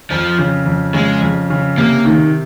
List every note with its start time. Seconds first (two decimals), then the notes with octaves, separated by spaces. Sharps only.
0.10 F2 F3
0.39 C#3
0.66 F2
0.94 C#3 G#3
1.21 F2
1.50 C#3
1.77 C3 A#3
2.05 D#3